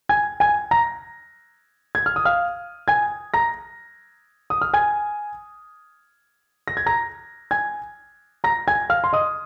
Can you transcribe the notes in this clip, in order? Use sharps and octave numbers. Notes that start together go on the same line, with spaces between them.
G#5 G#6
G#5 G#6
A#5 A#6
G#6
F6
D#6
F5 F6
G#5 G#6
A#5 A#6
D#6
F6
G#5 G#6
A#6
G#6
A#5 A#6
G#5 G#6
A#5 A#6
G#5 G#6
F5 F6
C6
D#5 D#6